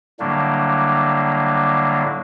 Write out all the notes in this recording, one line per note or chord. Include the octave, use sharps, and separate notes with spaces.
A2 D3 F#3 G3 A#3 D4